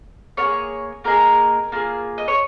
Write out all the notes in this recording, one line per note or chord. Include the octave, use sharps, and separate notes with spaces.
A#3 F4 G#4 C#5
A#3 D#4 G#4 A#4
A#3 F4 G#4
D#5
C#5